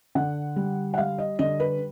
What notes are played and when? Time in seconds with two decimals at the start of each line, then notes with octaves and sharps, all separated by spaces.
0.15 D3 F#5
0.56 G3
0.94 F#5
0.98 G3 F5
1.18 D#5
1.39 D3 D#5
1.60 B4